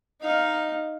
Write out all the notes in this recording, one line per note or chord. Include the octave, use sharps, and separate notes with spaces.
D#4 F5